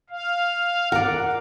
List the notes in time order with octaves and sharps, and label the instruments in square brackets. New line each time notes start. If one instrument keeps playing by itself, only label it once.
[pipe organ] F5
[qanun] A#4 D5 [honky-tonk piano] F#5